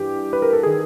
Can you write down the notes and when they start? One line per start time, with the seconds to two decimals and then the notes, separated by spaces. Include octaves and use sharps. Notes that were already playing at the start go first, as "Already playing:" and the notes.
Already playing: G2 E3 G4
0.33 B4
0.42 A#4
0.53 A4
0.63 D#3 G#4